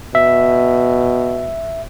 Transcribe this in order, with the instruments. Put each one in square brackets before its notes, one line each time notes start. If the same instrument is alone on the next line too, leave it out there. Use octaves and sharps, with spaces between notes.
[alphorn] B2 [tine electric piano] E5